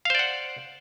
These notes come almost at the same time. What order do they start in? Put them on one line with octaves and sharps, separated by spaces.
F5 C5 D5 F#5